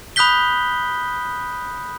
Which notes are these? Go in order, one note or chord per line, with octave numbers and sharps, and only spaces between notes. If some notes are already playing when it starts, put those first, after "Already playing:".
B5 D#6 F#6 G6 B6 G7